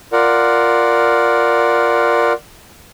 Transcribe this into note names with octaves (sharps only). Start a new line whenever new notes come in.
F4 A#4 D5 F#5